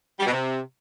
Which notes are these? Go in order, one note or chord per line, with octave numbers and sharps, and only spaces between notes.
G3
B2
C3